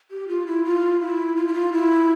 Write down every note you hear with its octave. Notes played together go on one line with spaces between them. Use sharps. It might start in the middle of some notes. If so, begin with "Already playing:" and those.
G4
F4
E4
F4
E4
F4
E4
F4
E4